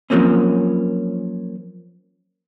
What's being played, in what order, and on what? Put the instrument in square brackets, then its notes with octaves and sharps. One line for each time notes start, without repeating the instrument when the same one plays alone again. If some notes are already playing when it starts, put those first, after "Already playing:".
[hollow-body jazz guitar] F3 F#3 A#3 C4 C#4